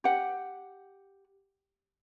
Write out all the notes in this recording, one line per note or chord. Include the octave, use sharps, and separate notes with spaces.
G4 F#5